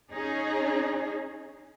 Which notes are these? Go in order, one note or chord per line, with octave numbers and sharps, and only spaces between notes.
C#4 D#4 G#4